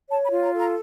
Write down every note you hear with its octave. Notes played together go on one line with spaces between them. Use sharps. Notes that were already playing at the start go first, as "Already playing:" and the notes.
C#5 A5
B5
F4
A#5
A4
A#5